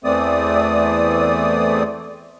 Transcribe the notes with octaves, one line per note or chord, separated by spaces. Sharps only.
E2 E3 A3 C4 D5 D#6